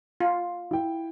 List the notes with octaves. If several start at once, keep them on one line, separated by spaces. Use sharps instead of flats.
F4
E4 G5